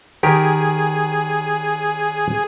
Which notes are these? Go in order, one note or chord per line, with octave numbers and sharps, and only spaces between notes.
D#3 G4 G#4 A#4